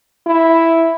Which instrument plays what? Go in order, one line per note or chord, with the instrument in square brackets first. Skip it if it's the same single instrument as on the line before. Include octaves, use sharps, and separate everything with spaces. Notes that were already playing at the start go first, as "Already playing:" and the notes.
[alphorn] E4